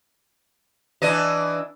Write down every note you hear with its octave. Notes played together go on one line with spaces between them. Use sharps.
E3 D4 D#5